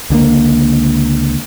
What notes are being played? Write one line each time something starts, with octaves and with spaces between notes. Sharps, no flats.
C#2 D3 G#3 A#3